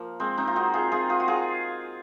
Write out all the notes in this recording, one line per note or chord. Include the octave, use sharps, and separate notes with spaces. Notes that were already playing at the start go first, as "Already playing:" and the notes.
Already playing: F3 A#3
G#3 C4
C4 D#4
F4
D#4 F#4
F4 G#4
F4 G#4
F4 G#4
F#4
F4 G#4